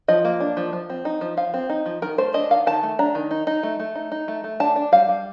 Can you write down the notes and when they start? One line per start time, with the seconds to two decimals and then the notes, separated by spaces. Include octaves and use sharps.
0.08 F3 D#5
0.25 A#3
0.40 D4
0.57 F3
0.73 F3
0.90 C4
1.05 D#4
1.21 F3
1.37 F3 F5
1.54 C4
1.69 D#4
1.86 F3
2.02 D#3 A#4
2.18 A3 C5
2.34 D4 D#5
2.50 D#3 F5
2.66 D#3 A5
2.83 A3
2.99 D4 A#5
3.15 D#3
3.31 D#4
3.47 D#4
3.63 A3
3.80 A3
3.95 D#4
4.12 D#4
4.28 A3
4.44 A3
4.60 D4 A5
4.76 D4
4.92 G3 F5
5.09 G3